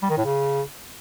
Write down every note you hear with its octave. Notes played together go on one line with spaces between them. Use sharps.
G3
D#3
A2
C#3